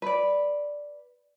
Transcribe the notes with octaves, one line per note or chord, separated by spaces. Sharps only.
B4 D5